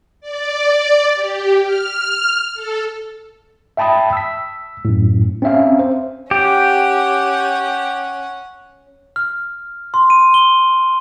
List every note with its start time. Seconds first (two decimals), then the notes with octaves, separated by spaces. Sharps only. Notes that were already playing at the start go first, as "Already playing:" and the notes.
0.21 D5
1.14 G4
1.63 F6
2.54 A4
3.77 E5 G5 A5 B5 D#6
4.13 E6 B6
4.85 F#2 A2
5.42 C4 C#4 E5 F5
5.79 C5
6.31 C#4 G4 F#5
9.16 F6
9.94 C6
10.10 D#7
10.34 G7